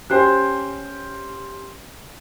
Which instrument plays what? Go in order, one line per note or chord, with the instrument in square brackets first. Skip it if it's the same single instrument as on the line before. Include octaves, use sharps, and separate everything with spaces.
[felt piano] C#4 G4 C5 [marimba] G5 F#6